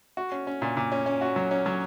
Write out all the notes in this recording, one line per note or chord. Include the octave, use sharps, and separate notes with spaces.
F#4
C#4
C#4
A#2
A#2
C#4
C#4
F#4
F#3
C#4
F#3